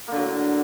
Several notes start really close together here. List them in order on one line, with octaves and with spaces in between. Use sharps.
A#3 D3 F#3 A2